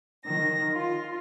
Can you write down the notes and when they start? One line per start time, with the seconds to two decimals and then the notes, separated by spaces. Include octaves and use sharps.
0.23 D#3 A#6
0.73 F4